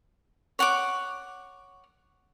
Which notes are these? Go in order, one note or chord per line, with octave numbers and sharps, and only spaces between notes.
C#5 F#5 C#6 D6